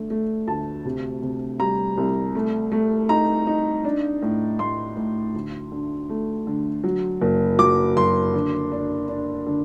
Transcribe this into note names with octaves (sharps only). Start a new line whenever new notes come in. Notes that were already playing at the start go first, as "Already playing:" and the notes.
Already playing: D3 A3
A3
D2 A5
C3
C3
G3 A#5
C2
A3
A3
D#4 A#5
D#4
D4
A2
A2 C6
A2
D2
D3
A3
D3
F#3
F#1
F#3 D6
F#1 C6
D3
D4
D4
D3